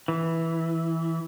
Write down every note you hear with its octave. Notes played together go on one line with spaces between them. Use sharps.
E3